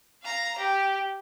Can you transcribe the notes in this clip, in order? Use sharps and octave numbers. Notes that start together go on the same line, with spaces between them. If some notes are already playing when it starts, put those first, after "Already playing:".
F5 A#5
G4